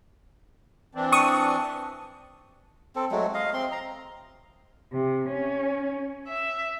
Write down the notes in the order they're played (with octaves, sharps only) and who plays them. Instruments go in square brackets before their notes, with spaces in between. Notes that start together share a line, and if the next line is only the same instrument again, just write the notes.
[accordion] E3 C4 D4
[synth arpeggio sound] C#6 D#6
[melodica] C4 A4
F#3 G#3 A3
D#5 F5
C4 C6
A#5
[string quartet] C3
C#4
E5